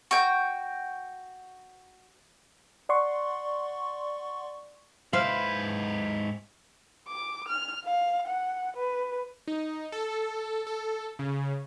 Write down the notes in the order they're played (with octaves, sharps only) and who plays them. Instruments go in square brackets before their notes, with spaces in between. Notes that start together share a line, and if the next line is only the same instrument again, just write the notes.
[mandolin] F#4 G5
[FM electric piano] D5 F#5 C6 C#6
[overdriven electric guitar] G#2 B4 [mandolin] E4 C5 [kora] F5
[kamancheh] D6
F6
F5
F#5
B4
[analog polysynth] D#4
A4
A4
C#3